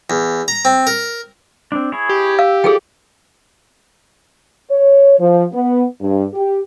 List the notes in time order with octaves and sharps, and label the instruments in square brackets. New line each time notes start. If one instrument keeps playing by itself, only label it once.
[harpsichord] E2
A#5
C4
A#4
[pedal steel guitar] C4 D4
E4 G#4 C#5
[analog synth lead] G4
[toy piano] F5 [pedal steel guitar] E6
[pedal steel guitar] F3 D5 [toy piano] G#4 A4 G5
[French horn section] C#5
F3
B3
G2
G4